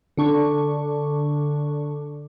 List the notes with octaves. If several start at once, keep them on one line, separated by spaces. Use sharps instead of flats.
D3 D4 C#6